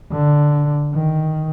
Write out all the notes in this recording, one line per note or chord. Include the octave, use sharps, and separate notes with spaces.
D3
D#3